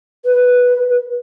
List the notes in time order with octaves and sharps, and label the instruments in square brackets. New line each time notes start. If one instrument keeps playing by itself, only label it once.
[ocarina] B4